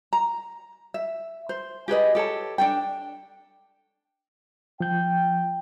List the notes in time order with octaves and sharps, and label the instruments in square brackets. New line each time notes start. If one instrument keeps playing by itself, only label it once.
[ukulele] A#5
E5
C5
G4 G#4 B4 D#5
G4 A4 C#5 A5
D4 A4 G5
[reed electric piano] F3 G6 [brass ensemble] G5